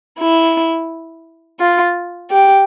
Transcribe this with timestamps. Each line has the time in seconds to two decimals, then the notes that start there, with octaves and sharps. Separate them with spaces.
0.19 E4
1.59 F4
2.30 G4